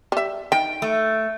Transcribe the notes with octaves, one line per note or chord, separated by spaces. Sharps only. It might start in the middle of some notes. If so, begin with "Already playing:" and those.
G3 E5
D#3 G5
A3